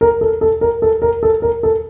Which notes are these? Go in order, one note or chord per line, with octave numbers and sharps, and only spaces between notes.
A#4
A4
A4
A#4
A4
A#4
A4
A#4
A4